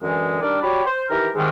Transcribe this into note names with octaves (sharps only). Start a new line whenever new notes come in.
F#2 D3 E3 G#3
D#3 G3 D4 A#4 D5
F#4 G4 C#5 D5 B5
C5
D#3 E3 G4 A#4
G#2 C3 D#3 G3 G#3